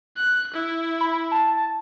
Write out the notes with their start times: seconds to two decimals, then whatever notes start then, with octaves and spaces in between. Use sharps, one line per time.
0.17 F#6
0.54 E4
1.01 B5
1.32 A5